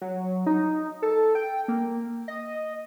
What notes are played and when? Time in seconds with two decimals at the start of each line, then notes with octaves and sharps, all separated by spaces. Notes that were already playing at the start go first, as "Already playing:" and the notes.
0.01 F#3
0.46 D#4
1.02 A4
1.35 G5
1.68 A#3
2.28 D#5